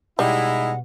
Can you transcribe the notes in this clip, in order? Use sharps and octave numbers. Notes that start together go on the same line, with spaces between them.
B2 G3 G#3 D#4 E4 F#5